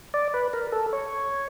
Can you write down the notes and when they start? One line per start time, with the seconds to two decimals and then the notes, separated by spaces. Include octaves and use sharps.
0.14 D5
0.34 B4
0.53 A#4
0.72 A4
0.93 C#5